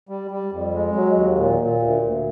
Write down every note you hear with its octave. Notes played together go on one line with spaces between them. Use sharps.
G3
G3
F2
G#3
F#3
D#2
A#2
A#2
D2
D2